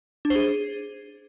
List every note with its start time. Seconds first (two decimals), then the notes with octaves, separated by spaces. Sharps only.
0.25 D4
0.30 C5
0.36 G#4